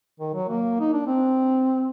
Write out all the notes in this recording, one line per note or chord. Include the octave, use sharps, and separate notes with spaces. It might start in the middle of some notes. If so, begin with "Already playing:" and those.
D#3
F#3
A#3
D#4
D4
C4